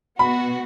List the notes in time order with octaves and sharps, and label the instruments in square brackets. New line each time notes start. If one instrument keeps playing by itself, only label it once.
[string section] B2 B3 F#4 [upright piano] B5